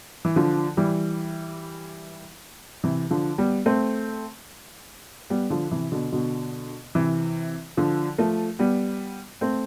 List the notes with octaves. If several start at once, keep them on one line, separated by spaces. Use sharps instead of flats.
E3
D3 F3
E3 G3
C3 E3
D3 F3
G3 B3
A3 C4
G3 B3
D3 F3
C3 E3
B2 D3
B2 D3
C3 E3
D3 F3
F3 A3
G3 B3
A3 C4